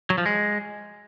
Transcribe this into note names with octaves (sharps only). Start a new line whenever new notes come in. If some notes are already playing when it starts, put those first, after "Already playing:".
F#3
F3
G#3